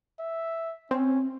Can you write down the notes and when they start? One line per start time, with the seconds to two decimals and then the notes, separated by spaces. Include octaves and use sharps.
0.19 E5
0.91 C4 C#4